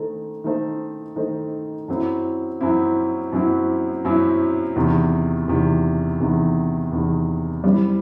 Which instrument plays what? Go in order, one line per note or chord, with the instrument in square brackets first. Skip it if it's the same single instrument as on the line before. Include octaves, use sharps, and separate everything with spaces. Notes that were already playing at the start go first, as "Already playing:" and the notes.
Already playing: [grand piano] D#3 A3 D#4 A4 C5
D#3 A3 D#4 A4 C5
D#3 A3 D#4 A4 C5
F#2 F#3 C4 E4
F#2 F#3 C4 E4
F#2 F#3 C4 E4
F#2 F#3 C4 E4
E2 C3 D#3
E2 C3 D#3
E2 C3 D#3
E2 C3 D#3
G3 C4 E4